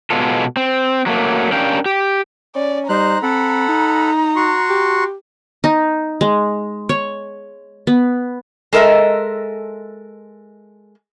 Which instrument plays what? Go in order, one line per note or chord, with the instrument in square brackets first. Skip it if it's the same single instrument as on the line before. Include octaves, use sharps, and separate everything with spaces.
[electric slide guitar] B2 G#3 B3 F4 A4
C4
F#3 A3 A#3
C#4 D4 G4 A#4 F5 G5
G4
[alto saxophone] C#4 [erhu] D5
[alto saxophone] G3 [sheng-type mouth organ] D#4 C5 F#6 [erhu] A#5
[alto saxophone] C4 [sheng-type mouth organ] A4 F#5 B5
[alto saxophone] D#4
[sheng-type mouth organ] F#4 C6 C#6
[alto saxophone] G4
[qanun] D#4
G#3
C#5
B3
[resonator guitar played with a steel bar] G#3 A4 A#4 D#5 E5